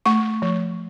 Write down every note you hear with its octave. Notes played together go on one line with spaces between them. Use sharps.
A3 C#6
F3